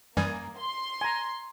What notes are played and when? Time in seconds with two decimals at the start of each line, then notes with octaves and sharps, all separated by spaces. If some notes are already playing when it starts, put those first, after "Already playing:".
0.17 F#2 E3 G3 A#3 G#5 D#6
0.58 C6
1.01 G#5 A#5